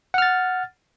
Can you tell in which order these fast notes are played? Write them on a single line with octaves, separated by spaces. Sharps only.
F#5 F6 A6